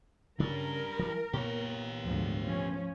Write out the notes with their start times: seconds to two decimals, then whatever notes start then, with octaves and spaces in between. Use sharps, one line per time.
0.40 C#3 G3 C#4 D4 A#4
0.99 E3
1.33 A#2 A#3 B3 G4 C#5
2.04 D2 G#2 F3
2.40 F3 C#4